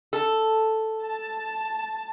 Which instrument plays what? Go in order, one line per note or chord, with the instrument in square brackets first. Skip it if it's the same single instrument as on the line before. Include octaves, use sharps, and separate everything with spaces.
[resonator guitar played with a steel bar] A4
[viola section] A5